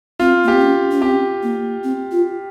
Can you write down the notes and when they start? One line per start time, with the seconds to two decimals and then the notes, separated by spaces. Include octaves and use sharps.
0.19 C4 F4
0.44 A#3
0.48 G4
0.53 C4
0.62 C#4
0.91 C#4
1.02 C4 G4
1.43 A#3
1.84 C4
2.12 F4